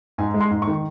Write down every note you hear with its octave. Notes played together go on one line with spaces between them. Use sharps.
G#2 G#5
G#3
C6
G#2
C#6
D#3